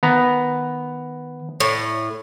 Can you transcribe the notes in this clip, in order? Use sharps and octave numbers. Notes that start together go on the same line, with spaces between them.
D#3 B3 A#5
A2